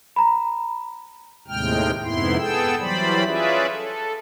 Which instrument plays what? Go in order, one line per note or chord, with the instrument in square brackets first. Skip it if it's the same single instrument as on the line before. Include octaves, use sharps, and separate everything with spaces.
[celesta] A#5 B5
[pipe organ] D#2 A2 C3 G#3 G5 F6
F2 G#2 C3 B3 E4 C6
B3 G#4 A4 G5 E6
E3 F#3 G3 C5 D5 B5
C#4 F4 G#4 B4 D5 E5
A4